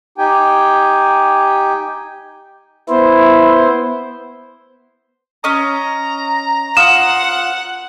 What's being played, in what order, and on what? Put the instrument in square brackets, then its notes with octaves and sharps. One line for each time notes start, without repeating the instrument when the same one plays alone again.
[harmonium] D#4 G4 G5 G#5
[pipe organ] B3 C5 [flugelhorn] E4
[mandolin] C#4 D#5 [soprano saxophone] A#5
[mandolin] F4 D#6 [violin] F#5 [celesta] E7